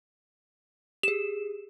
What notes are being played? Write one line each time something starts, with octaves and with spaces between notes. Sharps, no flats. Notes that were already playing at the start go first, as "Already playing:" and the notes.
G4 G#4 E7